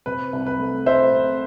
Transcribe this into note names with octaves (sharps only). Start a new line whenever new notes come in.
C3 B4
C2
B4
A3
A3 C5 E5
C3